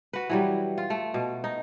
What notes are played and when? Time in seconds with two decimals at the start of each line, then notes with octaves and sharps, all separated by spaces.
0.13 F#4 B4
0.29 E3 F#3 G3
0.78 F4
0.90 A3
1.14 B2
1.44 D#4